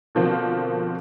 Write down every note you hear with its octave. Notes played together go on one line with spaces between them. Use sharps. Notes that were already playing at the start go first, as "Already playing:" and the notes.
B2 D3 F3 A#3 C4 F4